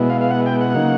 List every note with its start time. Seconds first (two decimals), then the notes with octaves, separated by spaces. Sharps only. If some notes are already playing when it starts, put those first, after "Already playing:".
Already playing: B2 G#3 B3 E4
0.10 F5
0.21 F5
0.31 F#5
0.46 G5
0.61 F#5
0.74 C#3 F#3 A#3 D#4